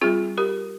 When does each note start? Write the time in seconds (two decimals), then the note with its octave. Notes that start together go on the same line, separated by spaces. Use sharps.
0.01 G3 C4 F4 G#4
0.38 G4 A#4